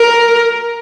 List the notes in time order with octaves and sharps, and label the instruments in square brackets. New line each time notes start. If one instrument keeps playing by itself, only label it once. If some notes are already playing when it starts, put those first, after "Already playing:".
Already playing: [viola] A#4